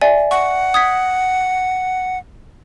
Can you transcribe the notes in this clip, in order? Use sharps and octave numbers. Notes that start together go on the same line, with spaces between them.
D5 E5 G#5
F#5 C#6
D#6 G#6 B6